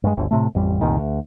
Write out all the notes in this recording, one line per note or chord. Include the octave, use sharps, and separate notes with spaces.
G2 G#3
G1 D2
A2 C3 A3
A1 F2 G3
F1 C2 A#2 D#3
D2